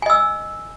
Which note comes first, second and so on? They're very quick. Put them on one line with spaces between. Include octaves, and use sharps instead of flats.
G#5 D#5 E6